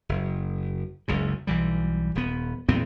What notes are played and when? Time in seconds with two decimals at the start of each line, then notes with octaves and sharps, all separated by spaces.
0.09 F#1
1.08 F#1 C#2 C#3
1.47 B1 E3 G3
2.15 D#1 B3
2.69 E2 A#2 B3 C4